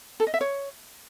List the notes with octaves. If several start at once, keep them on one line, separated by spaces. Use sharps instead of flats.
A4
D#5
E5
C#5